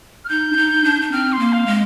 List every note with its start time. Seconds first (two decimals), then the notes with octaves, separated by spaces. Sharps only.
0.25 F6
0.29 D#4 G6
0.53 D4
0.57 D#4
0.84 D4
1.02 D4
1.12 C4 F6
1.32 C6
1.39 A#3
1.53 F5
1.67 G#3